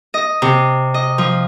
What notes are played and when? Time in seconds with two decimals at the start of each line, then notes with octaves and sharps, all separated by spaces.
0.14 D#5
0.42 C3
0.94 D#5
1.18 F3